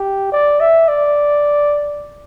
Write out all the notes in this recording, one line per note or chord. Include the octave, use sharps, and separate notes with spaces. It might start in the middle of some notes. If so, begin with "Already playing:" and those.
Already playing: G4
D5
E5
D5